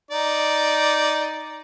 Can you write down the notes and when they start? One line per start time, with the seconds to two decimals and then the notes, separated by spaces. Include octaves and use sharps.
0.11 D#4 D5